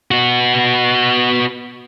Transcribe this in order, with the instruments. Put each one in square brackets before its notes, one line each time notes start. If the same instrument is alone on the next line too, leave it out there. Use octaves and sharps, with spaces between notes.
[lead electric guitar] B3 F#4